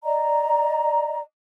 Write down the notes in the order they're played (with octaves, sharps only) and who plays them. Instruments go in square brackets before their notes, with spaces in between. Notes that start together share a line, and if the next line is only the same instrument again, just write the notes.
[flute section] D5 D#5 A#5